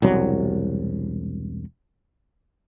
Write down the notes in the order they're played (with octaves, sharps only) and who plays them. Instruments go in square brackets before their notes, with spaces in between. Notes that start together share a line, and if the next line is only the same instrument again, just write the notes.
[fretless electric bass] E1 C2 F#3